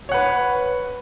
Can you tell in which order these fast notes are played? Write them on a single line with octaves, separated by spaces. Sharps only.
C#5 F#5 B4